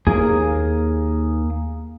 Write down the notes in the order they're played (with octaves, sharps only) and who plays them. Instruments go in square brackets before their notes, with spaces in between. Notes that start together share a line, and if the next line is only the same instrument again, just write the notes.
[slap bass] D#2 [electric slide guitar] A#3 G#4